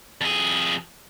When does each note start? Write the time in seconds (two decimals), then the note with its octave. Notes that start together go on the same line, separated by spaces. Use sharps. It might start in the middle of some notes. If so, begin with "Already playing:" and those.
0.21 F2 G#4